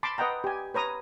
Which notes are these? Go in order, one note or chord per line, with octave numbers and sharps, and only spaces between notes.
A5 B5 C6 D6
B4 D#5 F#5 G5 A#5
G4 G#5
B4 C#5 A#5 D#6